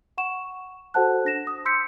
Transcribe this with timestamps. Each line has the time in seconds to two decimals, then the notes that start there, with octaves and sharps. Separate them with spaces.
0.18 F#5 C#6 E7
0.94 F#4 A4 C5 F#5 A5 F#6
1.25 D4 A#6 E7
1.47 D#6
1.65 C6 E6 G6 B6 C#7